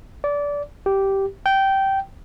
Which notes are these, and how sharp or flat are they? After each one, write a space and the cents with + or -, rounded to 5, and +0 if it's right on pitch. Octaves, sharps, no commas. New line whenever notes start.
D5 -20
G4 -10
G5 -15